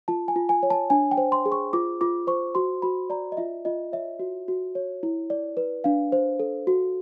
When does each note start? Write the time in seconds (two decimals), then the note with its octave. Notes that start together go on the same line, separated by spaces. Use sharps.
0.08 F4 A5
0.28 G#5
0.36 F4
0.49 G#5
0.63 C#5
0.70 A5
0.90 D4 G#5
1.11 G5
1.17 C5
1.32 C6
1.46 G#4
1.52 C#6
1.73 F4 D6
2.01 F4 D6
2.27 C5 C#6
2.55 F#4 C6
2.82 F#4 B5
3.10 D5 A#5
3.32 D#5
3.37 F4 E5
3.65 F4 D#5
3.92 C#5 E5
4.19 F#4
4.48 F#4
4.75 C#5
5.03 E4
5.30 D5
5.57 B4
5.84 D4 F5
6.12 C5
6.40 A4
6.67 F#4